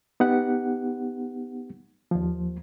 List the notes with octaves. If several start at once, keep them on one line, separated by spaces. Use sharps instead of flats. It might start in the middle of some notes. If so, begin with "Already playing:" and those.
B3 D#4 G4 F#5
D#2 F3